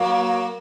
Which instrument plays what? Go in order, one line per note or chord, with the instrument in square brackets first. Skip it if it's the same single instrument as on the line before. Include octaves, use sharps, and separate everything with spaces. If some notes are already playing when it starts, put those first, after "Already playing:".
Already playing: [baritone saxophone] F#3 [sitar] A#3